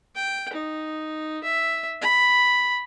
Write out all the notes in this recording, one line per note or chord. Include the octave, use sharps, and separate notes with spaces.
G5
D#4
E5
B5